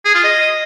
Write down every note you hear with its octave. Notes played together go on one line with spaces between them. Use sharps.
G#4
F4
D#5